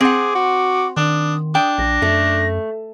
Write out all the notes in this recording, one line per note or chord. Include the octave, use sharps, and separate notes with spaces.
C4 G#4 F#5 D6
F#4
D#3 D4 D#6
D4 G5 D#6
A#1 A#6
F#2 A3